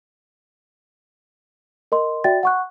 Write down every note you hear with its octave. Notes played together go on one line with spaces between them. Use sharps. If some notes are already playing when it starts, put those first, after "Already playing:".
A#4 D#5 C6
F#4 D5 E5 G5 A6
F#5 C#6 F#6